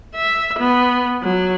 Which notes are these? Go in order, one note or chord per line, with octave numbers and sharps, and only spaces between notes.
E5
B3
F#3